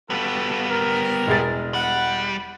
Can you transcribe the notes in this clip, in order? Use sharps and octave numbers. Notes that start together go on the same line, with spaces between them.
G3 B3 F4 F#4 A4
A#4
E1 G#4 A6
G3 F#5